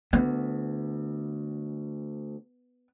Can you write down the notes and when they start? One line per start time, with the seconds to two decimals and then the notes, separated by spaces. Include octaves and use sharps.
0.13 D2 B3